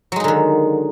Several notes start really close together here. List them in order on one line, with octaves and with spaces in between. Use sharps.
F#3 G#3 D#4 D3 D#3